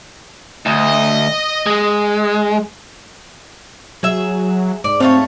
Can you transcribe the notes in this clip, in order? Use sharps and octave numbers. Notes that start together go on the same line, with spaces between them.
D2 D#5
G#3
F#3 G#4 E5
G#2 D5
A3 C4 F4 C#5